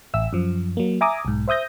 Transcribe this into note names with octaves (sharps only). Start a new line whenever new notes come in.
A1 E5 E6
F#2 F3
F#3 A#3
E5 G#5 A#5 D6 D#6
B1 G#2
C5 E5 D#6 G6 A#6